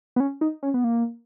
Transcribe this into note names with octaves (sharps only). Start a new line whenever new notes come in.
B3
C#4
D#4
C#4
B3
A#3